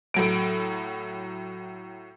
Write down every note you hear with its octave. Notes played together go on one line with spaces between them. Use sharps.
A2 F#3 D7